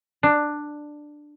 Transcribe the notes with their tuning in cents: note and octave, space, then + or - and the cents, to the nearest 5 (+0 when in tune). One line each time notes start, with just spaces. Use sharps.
D4 +10